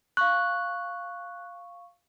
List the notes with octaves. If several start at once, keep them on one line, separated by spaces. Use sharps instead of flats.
F5 C#6 F#6